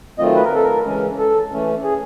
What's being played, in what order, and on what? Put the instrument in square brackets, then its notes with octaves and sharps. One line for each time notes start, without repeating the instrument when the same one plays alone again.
[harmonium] D#3 F#3 A3 C4 F4 [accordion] D#5
[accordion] B4
A#4
A4
A#4
[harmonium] C#3 E3 G#3 C#4
[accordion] A4
[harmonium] E3 A3 C#4
[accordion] G#4